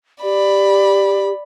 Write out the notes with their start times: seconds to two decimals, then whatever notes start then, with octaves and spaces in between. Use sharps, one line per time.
0.23 G4 D5 B5